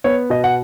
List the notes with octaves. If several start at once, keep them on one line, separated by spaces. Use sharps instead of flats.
B3 C#5
B2 D#5
F#5